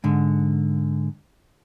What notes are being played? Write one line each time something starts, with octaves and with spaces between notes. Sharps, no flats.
G#2 D3